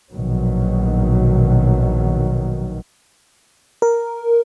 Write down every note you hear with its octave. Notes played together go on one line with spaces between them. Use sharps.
A#1 B2 D#3 F#3
A#4